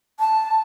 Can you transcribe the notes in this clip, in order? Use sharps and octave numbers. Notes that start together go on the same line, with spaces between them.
A5